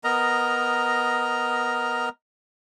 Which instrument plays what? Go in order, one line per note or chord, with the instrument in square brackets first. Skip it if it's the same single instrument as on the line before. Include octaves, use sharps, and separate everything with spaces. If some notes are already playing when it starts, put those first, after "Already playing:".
[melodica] B3 A#4 D#5 A#5